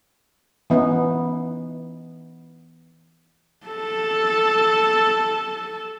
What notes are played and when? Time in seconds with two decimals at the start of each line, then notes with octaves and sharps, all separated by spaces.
0.70 E3 B3 C#4 D#4
3.66 A4 A5